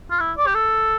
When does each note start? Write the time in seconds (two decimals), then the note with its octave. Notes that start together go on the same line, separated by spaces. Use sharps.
0.11 F4
0.20 E4
0.37 D5
0.47 G4
0.55 A4